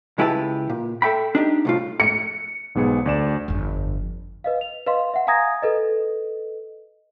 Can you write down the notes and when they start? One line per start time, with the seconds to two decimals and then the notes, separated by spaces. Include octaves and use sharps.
0.18 C#2 G#3 E4 G4 B4 A5
0.69 A#2
1.02 A4 E5 G5 B5
1.35 D4 D#4 G4
1.65 C2 A2 F4
2.00 C#7
2.75 B1 G#2 B3 G#4 C#7
3.06 D2 D5 E7
3.48 G1 F2
4.44 B4 D#5 F5
4.61 F7
4.86 B4 D#5 F5 C6
5.14 E5 F#5
5.27 F5 G#5 A#5 D#6 G#6 A#6
5.62 A4 B4 D#5